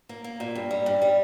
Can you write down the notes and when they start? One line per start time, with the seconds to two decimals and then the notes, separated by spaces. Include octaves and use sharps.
0.09 A#3
0.24 A#3
0.40 A#2
0.55 G2
0.71 G3
0.86 G2
1.02 G3